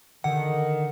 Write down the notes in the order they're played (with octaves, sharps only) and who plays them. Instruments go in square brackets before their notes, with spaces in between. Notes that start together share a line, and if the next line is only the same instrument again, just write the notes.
[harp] D3 [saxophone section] D#3 [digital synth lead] F#5